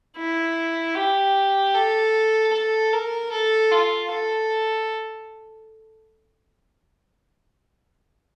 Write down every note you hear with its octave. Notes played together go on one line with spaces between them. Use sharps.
E4
G4
A4
A4
A#4
A4
F4
A4